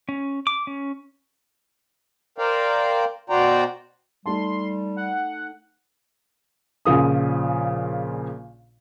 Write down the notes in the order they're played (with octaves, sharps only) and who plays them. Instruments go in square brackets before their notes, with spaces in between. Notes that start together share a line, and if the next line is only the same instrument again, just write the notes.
[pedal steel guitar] C#4
D6
C#4
[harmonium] A#4 C5 D5 F5 G5
B2 F#4 C5 D5 G5 A#5
[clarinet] G3 [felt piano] A3 D#4 A5 [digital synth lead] C6
[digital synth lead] F#5
[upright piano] A#1 A#2 C#3 F3 D#6